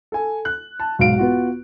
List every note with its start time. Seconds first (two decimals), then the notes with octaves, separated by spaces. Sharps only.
0.12 A4 G#5
0.45 F#6
0.80 A5
0.99 B1 G#2 F5 D7
1.17 B3 F4 F#4